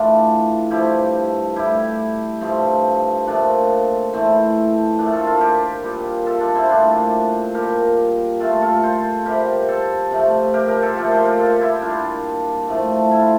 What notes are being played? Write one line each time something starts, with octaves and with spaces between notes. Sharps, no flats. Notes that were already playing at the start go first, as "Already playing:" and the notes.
Already playing: A2 E3 A3 D4 F4 A4
G2 F3 A3 E4 G4
A2 G3 E4 G4
G2 F3 A3 C4
A#2 F3 A3 D4
A2 E3 A3 C4
A#2 A3 D4
F4 A4
F4 A4
G4 A#4
A#2 G3
F4 A4
D4 F4
C4 E4
A#2 A3 D4 F4
A#2 G3 G4 A#4
A#2 A3 F4 A4
F4 A4
A4 C5
C3 G3 G4 A#4
A4 C5
C3 F3 A3
G4 A#4
G4 A#4
F4 A4
A#2 F3 A3 G4 A#4
A4 C5
G4 A#4
F4 A4
E4 G4
A#2 G3 D4 F4
A2 F3 A3
E4
F4